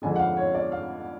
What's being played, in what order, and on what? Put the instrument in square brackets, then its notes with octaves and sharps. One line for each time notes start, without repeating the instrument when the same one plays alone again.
[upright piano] F2 D3 G#3 G#5
F#5
F5
C#5
D5
F5